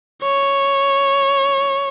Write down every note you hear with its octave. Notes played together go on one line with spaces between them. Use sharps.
C#5